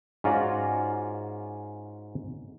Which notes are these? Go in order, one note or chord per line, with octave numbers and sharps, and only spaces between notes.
G#2 C#4 F4 F#4 D5 A#5